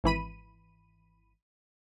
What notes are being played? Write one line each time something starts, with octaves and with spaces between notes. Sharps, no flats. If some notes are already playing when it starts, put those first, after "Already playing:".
G#1 E3 B5 D#7